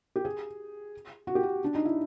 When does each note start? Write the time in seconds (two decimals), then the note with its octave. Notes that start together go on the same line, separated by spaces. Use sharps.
0.16 G4
0.25 G#4
1.27 F#4
1.35 G4
1.43 F#4
1.64 D4
1.75 D#4
1.85 E4